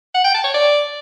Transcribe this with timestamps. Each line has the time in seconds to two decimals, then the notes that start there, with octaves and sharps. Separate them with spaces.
0.15 F#5
0.25 G5
0.35 A5
0.44 C#5
0.54 D5